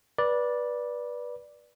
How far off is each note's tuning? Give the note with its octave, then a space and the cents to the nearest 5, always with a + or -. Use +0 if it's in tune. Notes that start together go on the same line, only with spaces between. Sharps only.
B4 -20 D5 +0